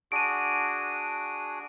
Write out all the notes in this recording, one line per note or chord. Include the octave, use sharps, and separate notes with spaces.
D4 F#4 G#4 D7 D#7